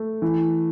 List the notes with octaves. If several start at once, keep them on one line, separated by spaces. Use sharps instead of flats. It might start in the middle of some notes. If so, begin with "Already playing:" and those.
Already playing: A3
E3